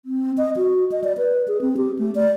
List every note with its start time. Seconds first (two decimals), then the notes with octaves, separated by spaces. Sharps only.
0.05 C4
0.38 D#5
0.57 F#4
0.92 D#5
1.04 D5
1.18 B4
1.48 G#4
1.61 C4
1.77 G4
1.99 A3
2.15 D5